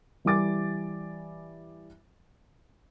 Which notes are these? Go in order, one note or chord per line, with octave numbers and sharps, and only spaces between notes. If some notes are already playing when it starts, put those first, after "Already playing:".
E3 G3 G#5 D6 A6